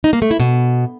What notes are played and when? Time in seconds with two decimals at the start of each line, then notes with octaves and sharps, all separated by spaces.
0.04 D#4
0.13 A#3
0.22 A3
0.31 E4
0.40 B2